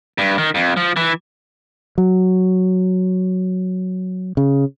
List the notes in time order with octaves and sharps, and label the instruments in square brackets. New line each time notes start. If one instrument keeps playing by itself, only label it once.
[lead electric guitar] G2
D#3
F2
F3
E3
[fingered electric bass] F#3
C#3